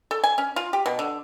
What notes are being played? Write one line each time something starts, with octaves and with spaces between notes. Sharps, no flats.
A4
G#5
C#4
F4
G4
B2
D3